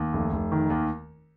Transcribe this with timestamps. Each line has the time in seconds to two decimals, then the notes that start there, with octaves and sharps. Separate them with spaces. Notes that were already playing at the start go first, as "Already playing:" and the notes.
Already playing: D#2
0.13 F1
0.33 F1
0.52 D#3
0.70 D#2